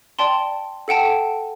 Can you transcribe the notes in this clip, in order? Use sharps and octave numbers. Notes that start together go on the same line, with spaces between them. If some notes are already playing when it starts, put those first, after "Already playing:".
D5 G5 A5 C6
A4 F#5 G5 A5